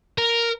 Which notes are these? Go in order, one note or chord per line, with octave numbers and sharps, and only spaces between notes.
A#4